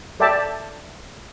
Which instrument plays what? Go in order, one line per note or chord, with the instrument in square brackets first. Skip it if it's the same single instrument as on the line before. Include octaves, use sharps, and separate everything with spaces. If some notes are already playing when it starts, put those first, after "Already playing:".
[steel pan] A4 D5 E5 G5 A5